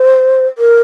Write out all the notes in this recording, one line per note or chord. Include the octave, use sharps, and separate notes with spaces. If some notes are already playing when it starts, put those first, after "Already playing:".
Already playing: C5
A#4